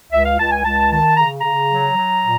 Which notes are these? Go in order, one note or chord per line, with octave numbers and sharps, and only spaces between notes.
C#2 E5
F5
C#2 A5
G#5
C#2 A5
D#3 A5
C#3 A#5
C#3 A#5
F#3
F#3
A#2